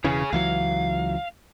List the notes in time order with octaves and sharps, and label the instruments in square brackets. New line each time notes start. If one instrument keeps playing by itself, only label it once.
[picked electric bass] E1 C#3 E3 [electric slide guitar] G#4 C#5
[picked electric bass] C#2 E3 F#3 [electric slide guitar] F5